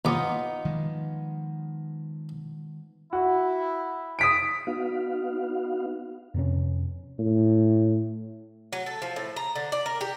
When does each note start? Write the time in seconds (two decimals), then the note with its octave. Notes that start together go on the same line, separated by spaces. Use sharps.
0.05 D#2 B3 D#4 F4 D6
0.65 D#3 F3 G#3
3.13 E4 F#4
4.19 D#6 B6 D7
4.67 B3 D#4 F#4 F5
6.34 F2 C3 C#4
7.19 A2
8.73 F#3
8.86 A4
9.02 F3
9.16 A2
9.36 A#5
9.55 D3
9.72 D5
9.86 A#4
10.01 G4